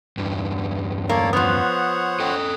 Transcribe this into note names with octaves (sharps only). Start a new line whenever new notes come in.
E2 G2
A#3 A4 C#5 D5
F3 B3 C5 C#5 F#5 D#6 F#6
A4 D#5 G5